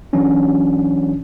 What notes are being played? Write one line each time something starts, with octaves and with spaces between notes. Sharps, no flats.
E3 F#3 C#4 D4